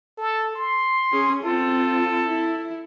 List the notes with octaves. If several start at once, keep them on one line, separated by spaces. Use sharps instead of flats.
A4
C6
C#4 G#4
C4 F4 A4
E4